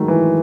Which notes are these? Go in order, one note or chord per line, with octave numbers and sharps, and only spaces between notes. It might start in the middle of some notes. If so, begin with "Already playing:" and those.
Already playing: D#3 F#3 G#3 A3
E3